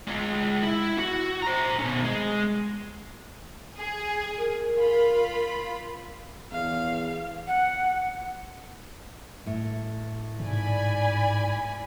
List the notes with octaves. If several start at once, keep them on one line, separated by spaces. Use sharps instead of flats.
G#3 F4
E4
F#4
C5 A#5
B2 C#4
G#3
G#4
A#4
F4 B5
E2 F5
F#5
A2
G#2 D5 G#5 B5